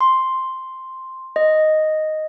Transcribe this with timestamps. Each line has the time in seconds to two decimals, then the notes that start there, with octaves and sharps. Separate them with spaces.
0.01 C6
1.36 D#5